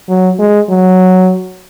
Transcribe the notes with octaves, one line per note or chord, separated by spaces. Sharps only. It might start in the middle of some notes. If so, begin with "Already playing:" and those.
F#3
G#3
F#3